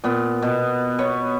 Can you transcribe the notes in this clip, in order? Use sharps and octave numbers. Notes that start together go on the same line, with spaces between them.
A#2 B3
B2
B3 C#5 C#6